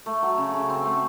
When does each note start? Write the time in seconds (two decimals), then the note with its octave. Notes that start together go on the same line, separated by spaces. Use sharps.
0.06 A3
0.22 F#3
0.38 C#3
0.54 C#3
0.69 C4
0.85 A3